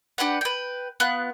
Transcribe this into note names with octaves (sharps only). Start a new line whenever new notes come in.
D4 G4 B4 F#5
B4 G5
B3 F4 F#6